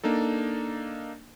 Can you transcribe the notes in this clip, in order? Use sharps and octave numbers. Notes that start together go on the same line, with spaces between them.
A#3 D4 D#4 A4